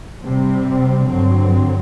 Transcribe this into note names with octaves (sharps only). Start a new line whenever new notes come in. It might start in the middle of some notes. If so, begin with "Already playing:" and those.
C3 G3 C4
G2 D3 F#3 C4